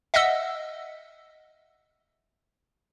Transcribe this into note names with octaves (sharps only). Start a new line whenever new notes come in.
D#5 E5 F#5 E6